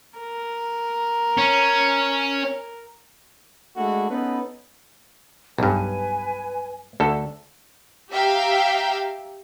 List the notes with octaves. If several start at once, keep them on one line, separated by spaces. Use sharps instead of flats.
A#4
C#4
G#3 A3 D4 E4 F#4
B3 C#4 D#4 A4 B4
B1 G2 B4 G#5
D2 A4
G4 E5 F5 G5 A#5